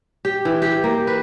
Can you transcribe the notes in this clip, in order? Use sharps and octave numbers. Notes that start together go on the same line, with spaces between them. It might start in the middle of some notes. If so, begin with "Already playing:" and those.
G4
E3
G4
A#3
B4